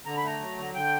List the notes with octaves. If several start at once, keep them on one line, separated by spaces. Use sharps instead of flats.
D3 A#5
B5
A3 A#5
F#3
D3
D3 G5